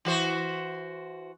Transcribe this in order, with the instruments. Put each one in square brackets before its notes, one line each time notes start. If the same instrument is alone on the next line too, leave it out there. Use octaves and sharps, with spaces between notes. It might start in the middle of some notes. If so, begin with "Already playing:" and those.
[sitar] E3 F#4 C5